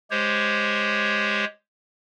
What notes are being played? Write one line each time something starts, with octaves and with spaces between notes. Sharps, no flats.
G#3 G4 C5 C#5